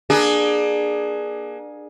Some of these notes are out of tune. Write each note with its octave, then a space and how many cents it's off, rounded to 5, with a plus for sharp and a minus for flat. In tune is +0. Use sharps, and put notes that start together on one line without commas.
A#3 +30 D4 +20 G#4 +5